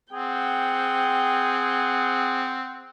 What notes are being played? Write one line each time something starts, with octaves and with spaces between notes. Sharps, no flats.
C4 G#4 F#5 G5